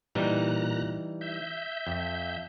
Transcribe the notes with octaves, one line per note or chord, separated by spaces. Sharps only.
A#2 E3 G3 D#4 A#5 F#6
E5 G6
F2